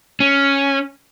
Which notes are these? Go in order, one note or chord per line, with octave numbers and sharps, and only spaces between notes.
C#4